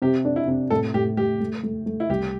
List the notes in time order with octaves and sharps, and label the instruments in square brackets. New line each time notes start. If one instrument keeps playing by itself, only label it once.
[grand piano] C3 [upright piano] G4
[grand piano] D4
[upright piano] E4
[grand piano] C3
[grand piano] A2 [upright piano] A4
[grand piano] A2 [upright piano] G4
[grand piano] A3 [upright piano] G4
[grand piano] A3
A3
A3
[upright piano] E4
[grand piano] C2 [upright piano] G4